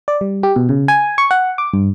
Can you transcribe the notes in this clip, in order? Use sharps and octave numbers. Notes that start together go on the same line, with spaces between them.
D5
G3
G4
B2
C#3
G#5
C#6
F#5
D6
G2